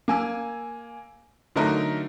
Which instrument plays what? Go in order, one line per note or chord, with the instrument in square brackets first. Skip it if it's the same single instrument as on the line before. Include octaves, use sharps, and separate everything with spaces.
[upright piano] A#3 G#5 E6
D3 F#3 A3 D#4 A#4